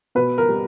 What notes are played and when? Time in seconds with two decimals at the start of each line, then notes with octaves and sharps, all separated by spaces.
0.15 B2 B4
0.38 A#4
0.49 G3